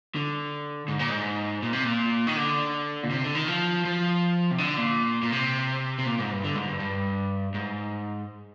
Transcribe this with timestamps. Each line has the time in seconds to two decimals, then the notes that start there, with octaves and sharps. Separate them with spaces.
0.15 D3
0.88 G#2
0.99 A#2
1.09 G#2
1.62 A#2
1.73 C3
1.84 A#2
2.27 D#3
2.36 D3
3.03 A#2
3.10 C3
3.23 D3
3.35 D#3
3.48 F3
3.85 F3
4.51 C3
4.58 D3
4.77 A#2
5.22 A#2
5.32 C3
5.98 C3
6.06 A#2
6.19 G#2
6.31 G2
6.44 D3
6.55 G#2
6.68 G2
6.80 G2
7.54 G#2